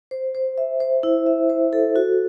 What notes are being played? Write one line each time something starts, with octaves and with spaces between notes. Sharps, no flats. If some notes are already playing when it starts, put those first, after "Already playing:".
C5
C5
E5
C5
E4
E5
C5
A4
F#4